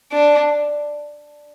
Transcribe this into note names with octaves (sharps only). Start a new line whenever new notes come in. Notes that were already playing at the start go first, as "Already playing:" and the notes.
D4